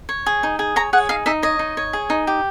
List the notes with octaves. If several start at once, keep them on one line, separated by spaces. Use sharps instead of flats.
C#5
G#4
D#4
G#4
C#5 A#5
G#4 F#5
D#4 F5
D#4 E5
C#5 D#5
D#4
C#5
G#4
D#4
G4